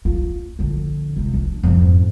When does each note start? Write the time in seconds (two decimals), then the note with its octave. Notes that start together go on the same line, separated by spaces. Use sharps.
0.05 F4
0.59 A#1 D3
1.16 C#2 C3
1.34 D4
1.63 F2 G#2